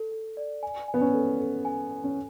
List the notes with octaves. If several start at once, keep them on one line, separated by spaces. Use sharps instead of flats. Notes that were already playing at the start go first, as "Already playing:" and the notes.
Already playing: A4
A4
D5
G#5
G#5
B3
C#4
A4
A4
G#5
G#5
C#4